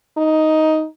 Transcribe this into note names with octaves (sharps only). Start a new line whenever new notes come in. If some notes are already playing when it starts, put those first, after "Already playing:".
D#4